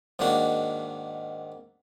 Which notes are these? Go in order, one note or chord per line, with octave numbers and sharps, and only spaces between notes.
G#2 D#3 A#3 D4 F#4